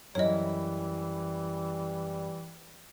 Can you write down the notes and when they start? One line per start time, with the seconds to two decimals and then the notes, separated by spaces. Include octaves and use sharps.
0.15 F#2 E3 G3 E4 C#5 D#5